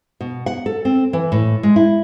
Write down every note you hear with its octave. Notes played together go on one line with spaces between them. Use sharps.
B2
F#5
A4
C4
E3
A2
G#3
E4